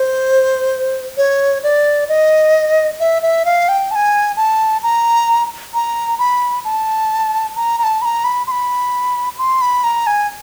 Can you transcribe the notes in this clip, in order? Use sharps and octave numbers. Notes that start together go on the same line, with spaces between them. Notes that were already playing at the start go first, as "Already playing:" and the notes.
Already playing: C5
C#5
D5
D#5
E5
E5
F5
G5
A5
G#5
A5
A#5
A#5
B5
A5
A#5
A#5
A5
B5
A#5
B5
C6
B5
C6
B5
A#5
G#5